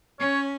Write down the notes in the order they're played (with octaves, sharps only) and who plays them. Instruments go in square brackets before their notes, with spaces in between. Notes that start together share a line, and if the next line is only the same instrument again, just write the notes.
[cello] C#4 [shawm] C#5